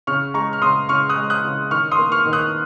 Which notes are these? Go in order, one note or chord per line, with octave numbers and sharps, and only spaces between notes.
C#3 C#6 F6
G#3 A#5 C#6
F6
C#3 C6 D#6
C#3 C#6 F6
D#6 F#6
G#3
D#6 F#6
C#3
D#3 C#6 F6
C6 D#6
A#3
C#6 F6
D#3
D#6 F#6